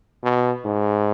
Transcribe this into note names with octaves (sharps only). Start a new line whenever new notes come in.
B2
G#2